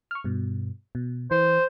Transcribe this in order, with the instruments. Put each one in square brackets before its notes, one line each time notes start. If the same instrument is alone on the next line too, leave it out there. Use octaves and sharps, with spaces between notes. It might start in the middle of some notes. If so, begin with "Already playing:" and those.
[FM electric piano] C#6 F6
G2 B2
B2
[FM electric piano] E3 [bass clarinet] C5